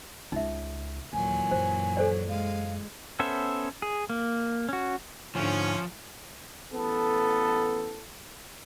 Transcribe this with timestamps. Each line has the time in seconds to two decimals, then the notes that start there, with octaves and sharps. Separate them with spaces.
0.32 C#2 D#4 E5
1.13 D#2 A#2 E3 F#3 G#5
1.51 F#2 C5
1.97 A4 C5 D5
2.29 G#3 F5
3.19 B3 C#4 A4 C5 E5
3.82 G#4
4.10 A#3
4.69 C#4 F#4
5.35 D2 G#2 D3 F3 C#4
6.73 A1 B3 A4